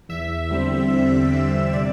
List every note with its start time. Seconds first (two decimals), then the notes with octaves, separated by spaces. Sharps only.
0.09 E2 E5
0.50 D3 G3 C4
0.91 E2
1.32 D3 G3 C4
1.73 C3 D5